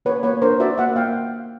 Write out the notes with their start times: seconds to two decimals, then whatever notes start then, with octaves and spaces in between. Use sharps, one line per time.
0.05 A#3 B4 C#5
0.23 A#3 B4 C#5
0.42 D4 A#4 C5
0.60 F#4 D5 E5
0.78 A#3 E5 F#5
0.96 A#3 F5 G5